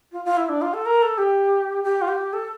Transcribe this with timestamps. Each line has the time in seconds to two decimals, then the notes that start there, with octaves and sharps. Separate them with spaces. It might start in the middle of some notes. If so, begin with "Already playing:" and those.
0.12 F4
0.25 F4
0.37 E4
0.49 D4
0.61 F4
0.73 A4
0.86 A#4
1.02 A4
1.18 G4
1.84 G4
2.01 F4
2.08 G4
2.33 A4